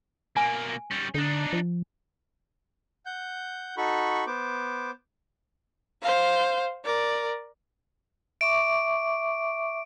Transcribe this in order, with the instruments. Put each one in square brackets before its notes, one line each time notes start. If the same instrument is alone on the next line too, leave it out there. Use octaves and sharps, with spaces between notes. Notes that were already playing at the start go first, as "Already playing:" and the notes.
[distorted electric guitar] B2 A#3 [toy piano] G#5
[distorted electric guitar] G3 C#4
[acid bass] D3 [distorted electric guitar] D4 D#4
[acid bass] F3
[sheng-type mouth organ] F#5 G6
D#4 F#4 A4 B5 C#6
B3 C5 D6
[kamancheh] C5 F5
A#4 D5
[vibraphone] E5 C#6 D6 [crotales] D7